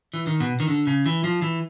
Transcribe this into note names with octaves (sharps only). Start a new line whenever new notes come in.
E3
D#3
B2
D#3
D3
C#3
E3
F3
E3